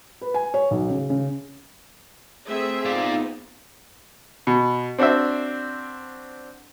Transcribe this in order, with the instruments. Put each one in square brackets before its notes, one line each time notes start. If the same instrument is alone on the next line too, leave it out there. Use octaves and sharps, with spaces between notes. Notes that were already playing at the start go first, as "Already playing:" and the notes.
[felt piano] B4
G#5
C#5
B1
C#3
C#3
[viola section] A3 G#4 E5 [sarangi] C4
[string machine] B3 D#4 [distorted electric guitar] F4 D5
[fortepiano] B2
C4 D4 F#4 C5 E5